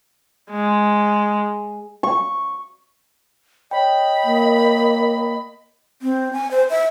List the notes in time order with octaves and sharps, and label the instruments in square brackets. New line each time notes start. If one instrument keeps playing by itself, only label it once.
[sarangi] G#3
[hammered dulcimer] C#6
[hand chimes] C#5 G5 [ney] D#5 [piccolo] B5
[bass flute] A#3
[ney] C4
G#5
C5
E5